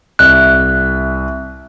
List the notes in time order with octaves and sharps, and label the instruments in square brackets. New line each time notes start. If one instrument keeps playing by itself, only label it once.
[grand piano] C2 E5 [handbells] F#6